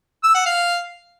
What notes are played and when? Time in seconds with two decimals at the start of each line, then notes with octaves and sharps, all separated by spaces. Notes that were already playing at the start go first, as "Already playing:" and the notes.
0.24 E6
0.35 F#5
0.46 F5